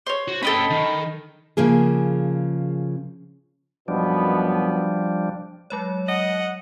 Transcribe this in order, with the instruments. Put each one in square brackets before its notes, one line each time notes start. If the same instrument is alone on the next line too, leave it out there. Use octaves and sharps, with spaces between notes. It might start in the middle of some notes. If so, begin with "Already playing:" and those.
[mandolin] C5 C#5
[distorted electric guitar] F#4
[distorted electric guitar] C#4 G5 [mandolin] A4 D#5 B5
[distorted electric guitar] D#3
[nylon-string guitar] C#3 F3 A#3 G#4
[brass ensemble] F#2 B2 B3 [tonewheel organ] F3 G3 D4
[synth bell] F#3 G#3 C#5
[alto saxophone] D#5 [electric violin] F#5